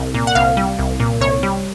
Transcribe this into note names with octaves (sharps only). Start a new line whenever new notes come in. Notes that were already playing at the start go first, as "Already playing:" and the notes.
Already playing: C2
A#2
F#5
C2 F5
G3
C2
A#2
C2 C#5
G3